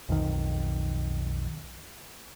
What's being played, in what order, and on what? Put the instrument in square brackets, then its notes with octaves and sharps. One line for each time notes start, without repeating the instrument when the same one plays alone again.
[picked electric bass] B1 F2 D#3